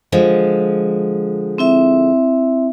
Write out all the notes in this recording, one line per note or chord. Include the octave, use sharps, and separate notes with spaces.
D3 F3 G#3
C4 E4 E5